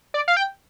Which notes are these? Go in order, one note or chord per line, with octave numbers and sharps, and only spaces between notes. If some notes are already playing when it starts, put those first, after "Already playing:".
D5
F5
G5